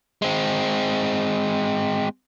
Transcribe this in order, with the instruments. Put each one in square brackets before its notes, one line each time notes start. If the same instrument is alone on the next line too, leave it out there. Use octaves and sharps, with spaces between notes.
[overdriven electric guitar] G#3 C4